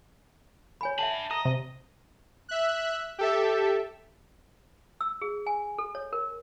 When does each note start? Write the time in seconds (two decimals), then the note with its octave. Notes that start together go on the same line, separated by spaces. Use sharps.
0.81 C#5 G#5 B5
0.99 D4 E5 F#5 A5 B5
1.31 D#5 A#5 D#6
1.45 C3
2.49 E5 F#6
3.18 G4 A4 E5
5.01 E6
5.21 G#4
5.46 G#5
5.78 A4
5.95 C#5
6.13 A#4